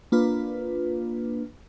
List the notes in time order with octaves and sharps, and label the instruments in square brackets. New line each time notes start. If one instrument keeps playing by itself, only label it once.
[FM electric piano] A#3 D4 F4 B4